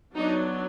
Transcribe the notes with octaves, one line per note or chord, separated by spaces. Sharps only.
F#3 B3 D4 D#4